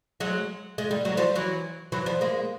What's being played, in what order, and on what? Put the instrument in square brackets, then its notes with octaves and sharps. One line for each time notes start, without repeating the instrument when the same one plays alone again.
[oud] F#3 G#3
G#3
G3
F#3
F3 G3
E3 F#3
E3 F#3
F3 G3
G#3 A#3